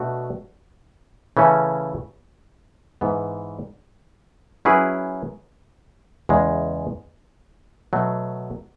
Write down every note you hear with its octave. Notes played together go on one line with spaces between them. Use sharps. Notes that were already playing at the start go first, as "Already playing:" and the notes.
Already playing: B2 A3 D4 F#4
C#3 E3 A3 C#4
G#2 E3 B3
F#3 C#4 E4 G#4 B4
E2 C#3 G#3
B2 F#3 A3